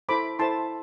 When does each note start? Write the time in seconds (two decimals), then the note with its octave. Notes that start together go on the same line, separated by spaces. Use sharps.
0.09 E4 A4 C5 B5 D6
0.39 E4 A4 C5 A5 C6